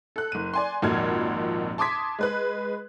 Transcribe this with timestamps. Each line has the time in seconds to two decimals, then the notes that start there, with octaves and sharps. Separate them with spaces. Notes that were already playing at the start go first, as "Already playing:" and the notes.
0.16 A4 F#6
0.32 F#1 D#7
0.54 D5 G#5 C6
0.82 G#1 F2 A#2 F#4 F6 G#6
1.78 A5 C6 D6 D#6 G#6 B6
2.19 G#3 B4 F#6